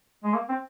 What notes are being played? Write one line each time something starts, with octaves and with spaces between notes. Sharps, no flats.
G#3
A#3
C4